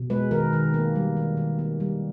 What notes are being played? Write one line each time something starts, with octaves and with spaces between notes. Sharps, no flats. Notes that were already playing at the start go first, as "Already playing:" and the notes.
Already playing: B2
G#3 B4
D#3 A#4
D#3
A#3
G3
D#3
D#3
A#3
G3